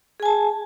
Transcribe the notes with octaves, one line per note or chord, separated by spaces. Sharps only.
G#4 G#5 A5